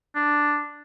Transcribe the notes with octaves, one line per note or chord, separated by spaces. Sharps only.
D4